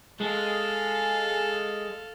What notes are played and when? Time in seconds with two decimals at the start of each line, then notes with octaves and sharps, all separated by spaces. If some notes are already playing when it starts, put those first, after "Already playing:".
0.21 G#3 A4 F5